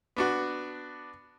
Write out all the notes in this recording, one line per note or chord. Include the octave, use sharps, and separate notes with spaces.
B3 D4 F#4